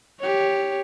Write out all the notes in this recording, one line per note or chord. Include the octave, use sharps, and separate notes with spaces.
G4 C#5